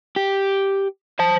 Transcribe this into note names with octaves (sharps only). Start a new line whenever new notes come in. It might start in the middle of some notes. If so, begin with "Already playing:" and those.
G4
C5 A5